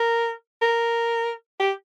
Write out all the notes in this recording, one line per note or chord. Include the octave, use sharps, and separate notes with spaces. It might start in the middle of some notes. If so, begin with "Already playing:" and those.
Already playing: A#4
A#4
G4